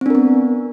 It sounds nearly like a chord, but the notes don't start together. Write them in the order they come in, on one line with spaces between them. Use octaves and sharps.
C4 D4 A#4 B3